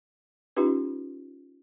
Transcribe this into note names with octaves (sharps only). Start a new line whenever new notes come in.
C#4 D#4 F4 G4 B4